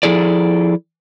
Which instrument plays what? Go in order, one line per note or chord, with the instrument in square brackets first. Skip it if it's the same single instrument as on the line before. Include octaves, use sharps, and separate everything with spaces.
[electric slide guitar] F3 E4 G#4 A4 D5